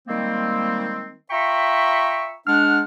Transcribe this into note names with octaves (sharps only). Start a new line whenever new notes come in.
D#3 G3 G#3 A#3 C4
F4 E5 G5 A#5 B5 C#6
G#3 D4 F#5 F6